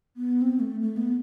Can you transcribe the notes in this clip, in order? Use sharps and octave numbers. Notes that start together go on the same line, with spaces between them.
B3
C4
A3
A3
B3